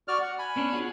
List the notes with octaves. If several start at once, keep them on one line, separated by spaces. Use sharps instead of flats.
F#4 D5 F6
F#5
G#5 B5
B3 C#4 D4
F4 F#4 G#4